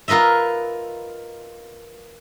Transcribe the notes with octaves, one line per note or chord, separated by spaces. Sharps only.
F4 A#4 B4 D#5 E5